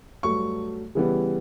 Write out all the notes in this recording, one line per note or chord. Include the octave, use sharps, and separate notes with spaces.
G2 F#3 A3 C#6
C#3 E3 G3 B3